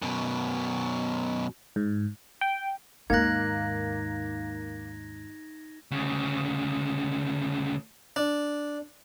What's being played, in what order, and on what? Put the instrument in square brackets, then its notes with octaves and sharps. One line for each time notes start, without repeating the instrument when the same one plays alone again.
[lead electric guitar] F#2 B2
[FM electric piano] G#2
G5
[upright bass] D#2 G#2 [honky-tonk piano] A#3 [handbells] D#4 F#6 [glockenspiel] G#6 A#6
[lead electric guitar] D2 C#3
[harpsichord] D4